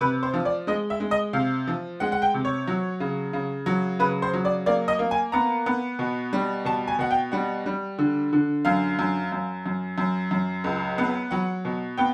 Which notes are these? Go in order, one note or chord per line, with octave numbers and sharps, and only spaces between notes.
C3 B4
C5
F3
D5
G#3 D#5
E5
G#3
D#5
C3 F5
F3
G#3 F#5
F#5
G5
C3
C#5
F#3
C#3
C#3
F#3
C#3 B4
C5
F#3
D5
A#3 D5
D#5
A#3
G#5
B3 A#5
B3
B2
G3
B2 A5
G#5
B2 F#5
G5
G3 F#5
G3
D3
D3
F#2 F5
F#2
F#2
F#2
F#2
F#2
C#2
B3
F#3 F#5
B2
B3 G5